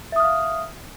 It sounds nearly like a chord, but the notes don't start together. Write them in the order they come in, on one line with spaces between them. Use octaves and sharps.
E5 D#6 F6 F5